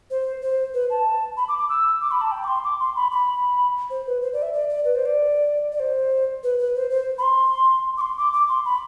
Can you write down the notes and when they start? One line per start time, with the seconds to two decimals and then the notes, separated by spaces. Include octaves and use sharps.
0.11 C5
0.42 C5
0.74 B4
0.90 A5
1.37 B5
1.48 D6
1.59 D6
1.69 E6
2.01 D6
2.11 B5
2.21 A5
2.32 G5
2.44 D6
2.48 C6
2.64 D6
2.79 C6
2.96 B5
3.11 B5
3.90 C5
4.07 B4
4.22 C5
4.33 D5
4.42 E5
4.53 D5
4.70 D5
4.85 B4
4.95 C5
5.06 D5
5.72 D5
5.80 C5
6.43 B4
6.59 B4
6.75 C5
6.90 C5
7.18 B5
7.22 C6
7.97 D6
8.01 C6
8.18 D6
8.33 D6
8.49 C6
8.65 B5